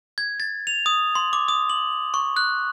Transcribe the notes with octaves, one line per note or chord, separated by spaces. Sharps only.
G#6
A6
F7
D#6
C6
D6
D#6
F#7
C#6
F#6